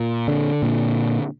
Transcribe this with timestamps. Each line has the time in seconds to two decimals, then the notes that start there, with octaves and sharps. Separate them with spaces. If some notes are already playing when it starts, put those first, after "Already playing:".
Already playing: A#2
0.28 D3
0.62 A#2